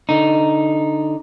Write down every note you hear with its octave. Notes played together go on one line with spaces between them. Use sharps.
D3 D#4